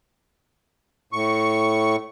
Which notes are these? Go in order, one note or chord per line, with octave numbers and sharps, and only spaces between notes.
A2 C#6